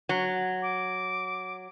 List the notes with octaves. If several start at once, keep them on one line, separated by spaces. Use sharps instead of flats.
F#3
D6